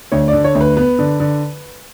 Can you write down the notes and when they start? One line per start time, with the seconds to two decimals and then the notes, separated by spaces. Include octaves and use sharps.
0.12 D2 C#5
0.28 D5
0.33 D3
0.44 C#5
0.55 D2
0.61 B4
0.77 B3 B4
0.99 D3
1.20 D3